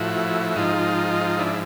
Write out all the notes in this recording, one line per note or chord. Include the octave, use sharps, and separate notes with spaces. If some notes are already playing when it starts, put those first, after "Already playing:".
Already playing: A2 F3 E4 F#4
F#4
G#2 F3 D#4 F4
D4 E4